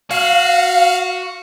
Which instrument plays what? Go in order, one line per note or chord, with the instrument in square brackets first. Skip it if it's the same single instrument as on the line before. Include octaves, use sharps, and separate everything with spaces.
[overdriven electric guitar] F#4 [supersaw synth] F5